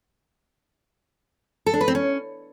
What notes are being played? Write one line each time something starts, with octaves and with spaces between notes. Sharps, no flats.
A4
D4
B4
C4
C#4